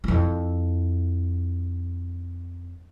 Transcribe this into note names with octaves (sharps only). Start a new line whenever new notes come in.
F2 E4